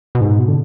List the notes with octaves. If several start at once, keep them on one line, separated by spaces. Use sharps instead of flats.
B2
G#2
B2
D3